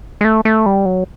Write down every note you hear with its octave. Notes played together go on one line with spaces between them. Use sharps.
G#3
A3
A3
G3
F#3